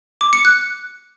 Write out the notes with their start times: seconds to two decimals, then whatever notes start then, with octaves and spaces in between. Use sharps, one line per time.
0.21 D6
0.33 C#7
0.45 F#6